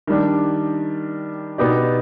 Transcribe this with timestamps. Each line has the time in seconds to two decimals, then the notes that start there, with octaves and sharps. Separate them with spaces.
0.07 D#3 G3 D4
1.58 B2 B3 D#4 G4 D5